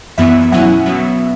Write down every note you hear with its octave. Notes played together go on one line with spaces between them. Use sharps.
F#2 E3 B3 E5
E5
B2 F#3 C#4 E4 F#5
B2 F#3 B3 E5